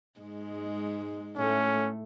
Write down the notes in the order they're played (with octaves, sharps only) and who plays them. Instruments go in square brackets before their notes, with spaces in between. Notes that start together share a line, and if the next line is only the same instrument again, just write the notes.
[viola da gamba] G#2 G#3
[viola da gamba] A2 A3 [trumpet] C#4